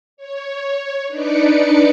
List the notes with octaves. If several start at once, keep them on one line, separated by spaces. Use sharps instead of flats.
C#5
D4 D#4 B4 D5 D6 C#7